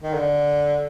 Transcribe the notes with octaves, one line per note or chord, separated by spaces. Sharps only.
D#3
D3